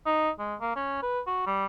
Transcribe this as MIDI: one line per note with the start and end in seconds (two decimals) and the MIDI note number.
0.06 0.30 63
0.39 0.55 56
0.61 0.72 58
0.76 1.02 61
1.02 1.20 71
1.27 1.42 66
1.46 1.66 55